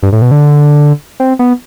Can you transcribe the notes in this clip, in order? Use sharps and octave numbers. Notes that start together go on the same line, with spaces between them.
G2
A2
B2
D3
C4
B3